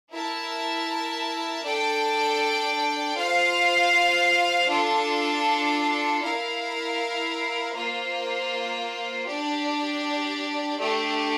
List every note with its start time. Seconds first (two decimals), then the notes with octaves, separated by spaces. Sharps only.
0.11 E4 A#4 E5 A5
1.64 D4 A4 D5 G5
3.16 F4 C5 F5
4.69 D4 F4 A4
6.21 E4 A#4 F5
7.73 A#3 F4 C5
9.27 D4 G4 D5
10.79 A3 D4 G4